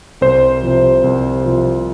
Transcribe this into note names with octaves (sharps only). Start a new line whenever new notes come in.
C2 C5
C3 F3
C2
C3 F3